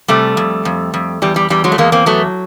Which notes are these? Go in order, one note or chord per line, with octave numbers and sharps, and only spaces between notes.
C3 G3 A3
F2
F2
F2
E2 G3
G3
E2 G3
F#3 G#3
A3
E2 G#3 A#3
A#3 C4
F#3 A3 B3